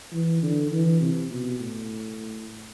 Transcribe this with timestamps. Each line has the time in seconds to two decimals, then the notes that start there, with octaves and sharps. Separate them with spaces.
0.13 E3
0.42 D3
0.72 E3
1.01 C3
1.31 B2
1.60 A2